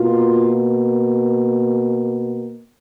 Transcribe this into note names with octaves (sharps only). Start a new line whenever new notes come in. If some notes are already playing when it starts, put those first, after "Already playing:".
Already playing: B2 A#3 F4